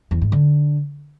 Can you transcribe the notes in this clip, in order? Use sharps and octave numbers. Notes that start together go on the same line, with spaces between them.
E2
G#2
D3